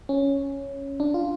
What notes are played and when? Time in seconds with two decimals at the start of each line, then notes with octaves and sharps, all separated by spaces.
0.09 C#4
1.00 D4
1.14 F4